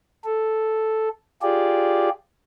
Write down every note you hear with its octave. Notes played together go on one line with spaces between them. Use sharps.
A4
F4 G4 G#4 D5